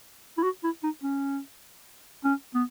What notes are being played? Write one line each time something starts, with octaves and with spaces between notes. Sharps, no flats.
E4
F#4
E4
D#4
C#4
C#4
B3